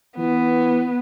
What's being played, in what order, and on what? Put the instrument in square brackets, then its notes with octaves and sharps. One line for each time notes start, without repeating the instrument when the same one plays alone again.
[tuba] E3 [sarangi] B3